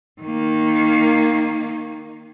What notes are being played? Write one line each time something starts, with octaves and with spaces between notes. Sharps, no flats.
D#3 A#3